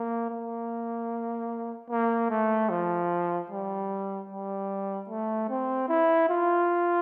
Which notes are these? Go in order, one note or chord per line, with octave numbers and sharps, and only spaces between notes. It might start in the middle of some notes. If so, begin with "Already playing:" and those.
Already playing: A#3
A#3
A#3
A3
F3
G3
G3
A3
C4
E4
F4